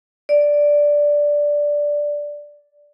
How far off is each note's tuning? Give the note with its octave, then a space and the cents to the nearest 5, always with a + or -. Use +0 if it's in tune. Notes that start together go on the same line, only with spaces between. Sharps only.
D5 -5